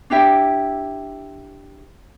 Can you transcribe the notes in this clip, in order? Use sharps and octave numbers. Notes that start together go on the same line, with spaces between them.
D4 E4 G4 E5